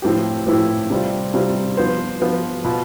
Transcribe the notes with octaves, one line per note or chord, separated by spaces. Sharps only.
A2 F3 C4 E4 G4
A2 F3 C4 E4 G4
C3 G3 C4 F4
C3 G3 C4 F4
F3 B3 F4 C5
F3 B3 F4 C5
B2 B3 F4